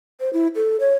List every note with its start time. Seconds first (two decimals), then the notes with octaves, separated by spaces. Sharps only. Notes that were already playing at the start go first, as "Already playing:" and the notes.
0.20 C5
0.33 E4
0.55 A4
0.80 C#5